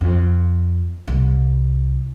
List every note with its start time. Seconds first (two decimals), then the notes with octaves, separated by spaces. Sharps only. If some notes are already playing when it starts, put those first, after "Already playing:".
0.01 F2
1.07 C2